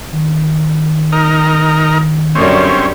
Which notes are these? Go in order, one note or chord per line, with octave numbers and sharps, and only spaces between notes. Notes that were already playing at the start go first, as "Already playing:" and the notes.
D#3
D#4 A#4
F#2 D3 G3 C4 C#4